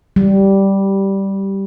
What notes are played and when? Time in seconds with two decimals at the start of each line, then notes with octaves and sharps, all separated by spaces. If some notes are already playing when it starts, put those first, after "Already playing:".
0.16 G3